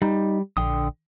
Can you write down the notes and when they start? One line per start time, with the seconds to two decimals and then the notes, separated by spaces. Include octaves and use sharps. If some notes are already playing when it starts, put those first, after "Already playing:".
0.02 G3 D#4
0.57 A#1 D3 G5 D#6